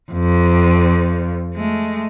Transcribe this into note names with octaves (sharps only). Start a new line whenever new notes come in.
F2
G#3 A3